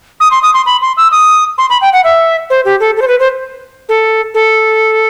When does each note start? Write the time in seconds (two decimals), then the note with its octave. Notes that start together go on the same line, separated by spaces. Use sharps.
0.20 D#6
0.31 C6
0.43 D#6
0.54 C6
0.66 B5
0.82 C6
0.97 E6
1.12 D#6
1.58 C6
1.70 B5
1.82 G5
1.93 F#5
2.04 E5
2.50 C5
2.65 G4
2.80 A4
2.97 A4
3.02 C5
3.08 B4
3.20 C5
3.89 A4
4.34 A4